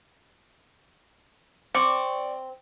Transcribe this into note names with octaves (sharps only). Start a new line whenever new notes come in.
C4 D5 C#6